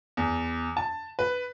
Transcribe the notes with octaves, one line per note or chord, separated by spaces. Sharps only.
E2
A5
B4